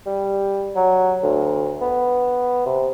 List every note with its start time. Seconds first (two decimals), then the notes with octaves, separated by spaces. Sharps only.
0.06 G3
0.76 F#3
1.23 D2
1.81 B3
2.66 C3